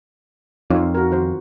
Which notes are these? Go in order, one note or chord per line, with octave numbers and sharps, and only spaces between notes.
F2 D#4 F4 C#5
F#4 A#4
D#3 F#4 C5